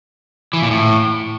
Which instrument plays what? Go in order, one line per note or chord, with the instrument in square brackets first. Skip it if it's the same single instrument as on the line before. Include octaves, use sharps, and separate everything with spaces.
[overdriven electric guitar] E3
A#2
A2